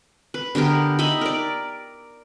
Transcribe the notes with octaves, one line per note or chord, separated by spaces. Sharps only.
B4
D3 B3 G4 A#4
D#4 D#5 E5 B5
A#4 D5